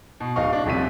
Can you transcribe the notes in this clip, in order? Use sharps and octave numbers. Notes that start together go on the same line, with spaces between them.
B2
D1 D#4 F5 C#6
D4
D#1 F2 C3 B6 D#7